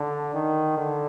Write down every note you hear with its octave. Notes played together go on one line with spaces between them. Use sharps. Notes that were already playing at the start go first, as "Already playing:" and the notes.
Already playing: D3
D#3
D3